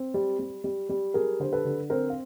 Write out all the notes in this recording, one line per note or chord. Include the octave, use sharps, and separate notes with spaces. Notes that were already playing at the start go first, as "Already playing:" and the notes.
Already playing: C4
G3
G3
G3
G3
G3 G#4 A#4
D3 C5
A4 B4
D3
C4 A#4 C5
F5